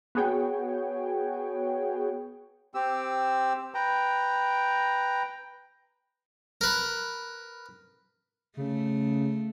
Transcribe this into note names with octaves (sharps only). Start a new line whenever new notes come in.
B3 F#4 G#4 C#5 G5
C4 G4 E6
B4 G5 A#5
A#4 B4
C#3 A3